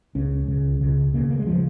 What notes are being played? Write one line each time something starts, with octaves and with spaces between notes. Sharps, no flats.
C#2 C#3 C#4
C#2 C#3
C#2 C#3
D#2 C#3 A#3
A#3
G#3
C#3 F3